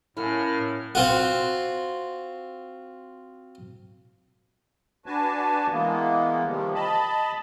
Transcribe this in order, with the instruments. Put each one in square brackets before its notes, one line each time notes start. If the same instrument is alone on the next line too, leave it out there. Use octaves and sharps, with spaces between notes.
[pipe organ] A2 F6 [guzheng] F#3 A#3 C#4 [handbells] E4
[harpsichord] C4 F4 F#4
[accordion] D4 F#4 B4 G#5 A5
E3 G#3 A#3 B3
C3 D#3 F3 G3
D#5 A5 B5